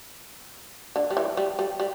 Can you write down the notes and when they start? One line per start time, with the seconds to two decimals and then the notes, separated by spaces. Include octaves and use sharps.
0.96 D3
1.11 G3
1.17 E3
1.37 G3
1.59 G3
1.80 G3